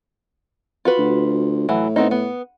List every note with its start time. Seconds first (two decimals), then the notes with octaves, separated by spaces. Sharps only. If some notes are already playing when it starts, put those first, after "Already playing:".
0.85 F4 F#4 B4
0.98 D2
1.69 A2 E3 F#3
1.96 B3 C4 D#4
2.11 B3